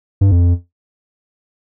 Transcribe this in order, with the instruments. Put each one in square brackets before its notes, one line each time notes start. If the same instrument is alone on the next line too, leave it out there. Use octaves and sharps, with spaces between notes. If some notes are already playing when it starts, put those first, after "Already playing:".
[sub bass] G2
F2